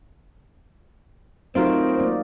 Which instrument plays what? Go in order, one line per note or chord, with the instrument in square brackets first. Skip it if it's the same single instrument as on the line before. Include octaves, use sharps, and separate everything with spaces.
[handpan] F#3 D#4 F#4 [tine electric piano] A3 F4 A#4 [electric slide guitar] C4 [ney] C5
[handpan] A#3 D5